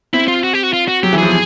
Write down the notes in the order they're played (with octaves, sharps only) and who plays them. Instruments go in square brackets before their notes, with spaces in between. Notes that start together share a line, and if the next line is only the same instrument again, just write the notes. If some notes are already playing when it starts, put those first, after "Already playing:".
[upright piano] C4 [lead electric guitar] E4
[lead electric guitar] F4
F#4
G4
F#4
F4
F#4
[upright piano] F#3 [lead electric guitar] G4
[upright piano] E3
[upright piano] F3 [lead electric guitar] G#4